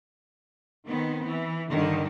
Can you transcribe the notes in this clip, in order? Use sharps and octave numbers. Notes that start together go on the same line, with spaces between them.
D#3 B3 C4
E3
G2 D3 D#3 D4